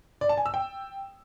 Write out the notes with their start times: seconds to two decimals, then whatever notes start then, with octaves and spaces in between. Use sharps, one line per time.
0.21 D5
0.29 A5
0.37 G#5
0.46 E6
0.54 G5